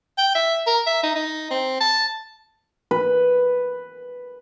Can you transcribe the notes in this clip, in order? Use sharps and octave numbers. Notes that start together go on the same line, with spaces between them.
G5
E5
A#4
E5
D#4
D#4
C4
A5
B4